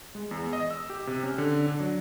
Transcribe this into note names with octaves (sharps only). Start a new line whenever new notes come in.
G#3
E2
D#5
E6
G4
C3
C#4
D3
D4
F#3